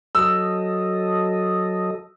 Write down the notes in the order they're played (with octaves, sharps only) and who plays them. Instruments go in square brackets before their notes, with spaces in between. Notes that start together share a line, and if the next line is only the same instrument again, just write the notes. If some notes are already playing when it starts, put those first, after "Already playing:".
[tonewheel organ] F#3 A4 D#5 [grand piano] E6